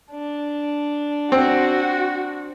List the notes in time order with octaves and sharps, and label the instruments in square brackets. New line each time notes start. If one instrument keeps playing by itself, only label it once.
[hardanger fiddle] D4
[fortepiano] C4 [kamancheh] F#4